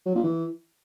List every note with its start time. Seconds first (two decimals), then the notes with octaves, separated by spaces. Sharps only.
0.06 F#3
0.15 A#2
0.24 E3